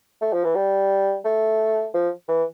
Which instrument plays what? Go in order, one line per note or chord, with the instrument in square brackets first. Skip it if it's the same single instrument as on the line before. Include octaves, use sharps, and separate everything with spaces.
[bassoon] A3
F3
E3
G3
A3
F3
E3